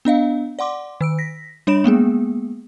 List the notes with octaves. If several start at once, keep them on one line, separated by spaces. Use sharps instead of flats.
B3 D4 D#5 F5
D5 F#5 C6 D6
D#3 E6 D7
A#6 B6
G3 D4 C#5 B5 D7 E7
G#3 A#3 B3 G#4